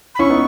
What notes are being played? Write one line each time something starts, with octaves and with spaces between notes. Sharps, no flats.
B5
C#4 E4 C#6
B3 D#4